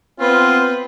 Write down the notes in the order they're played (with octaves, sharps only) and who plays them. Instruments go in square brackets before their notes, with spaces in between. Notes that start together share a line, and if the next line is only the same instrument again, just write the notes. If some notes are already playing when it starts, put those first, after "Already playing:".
[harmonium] B3 [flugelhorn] C4 [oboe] F4 [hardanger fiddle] B4